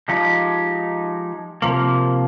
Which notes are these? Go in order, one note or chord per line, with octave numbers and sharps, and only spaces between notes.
F3 G#3 D#4 G4
C3 F3 A#3